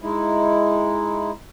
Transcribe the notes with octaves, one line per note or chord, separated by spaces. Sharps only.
G#3 D#4 E4